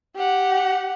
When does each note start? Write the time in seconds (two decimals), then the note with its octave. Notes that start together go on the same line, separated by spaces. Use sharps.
0.16 G4 F#5